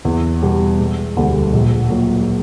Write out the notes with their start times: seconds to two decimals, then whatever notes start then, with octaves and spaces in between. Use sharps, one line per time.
0.05 E2
0.42 B2 G3
0.79 E1
1.16 D2 D3 G3
1.53 A#1
1.90 A#2 F#3 A#3